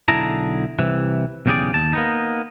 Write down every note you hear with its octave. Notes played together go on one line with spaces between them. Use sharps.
B1 D3 E4 G#4 A5 A#5
C2 C3 E3
B1 E2 C#3 G4 G#4 D5
D#2 A5
A#3 B3 D#4